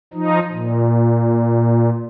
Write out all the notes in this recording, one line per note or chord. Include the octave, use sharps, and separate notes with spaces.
F3 D#4
A#2